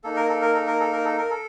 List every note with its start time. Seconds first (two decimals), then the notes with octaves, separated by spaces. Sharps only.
0.04 A#3 D#4 A4
0.16 A#4
0.29 A4
0.41 A#4
0.55 A4
0.67 A#4
0.80 A4
0.92 A#4
1.05 A4
1.18 A#4
1.30 A4